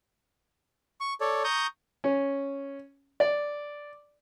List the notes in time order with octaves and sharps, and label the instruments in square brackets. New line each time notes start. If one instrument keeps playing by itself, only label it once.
[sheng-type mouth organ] C#6
A4 C#5 D5
A#5 C#6 D#6 G6
[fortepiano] C#4
D5